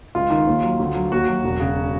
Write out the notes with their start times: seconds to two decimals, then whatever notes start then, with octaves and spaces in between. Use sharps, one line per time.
0.15 C#2 F4
0.30 D#3
0.47 D#2
0.63 F#3
0.80 D2
0.95 F#3
1.12 D#2 F#4
1.28 F#3
1.44 E1
1.60 C#3